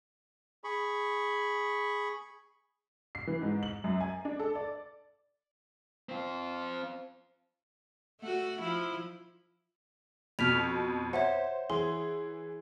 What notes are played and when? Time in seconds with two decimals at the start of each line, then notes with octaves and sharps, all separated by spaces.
0.64 G#4 B5 C#6
3.15 C7
3.27 E3
3.42 G#2
3.63 F#7
3.84 F#2
4.00 G#5
4.25 D4
4.39 A4
4.55 D5
6.09 C4 F4
8.21 A3 F#4
8.61 F3 E4
10.39 F2 B2 F6 B6 F7
11.13 C5 C#5 E5 F#5
11.70 E3 G#4 C6